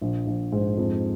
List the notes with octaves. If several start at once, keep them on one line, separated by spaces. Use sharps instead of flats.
A#1
A#1
G#2
F2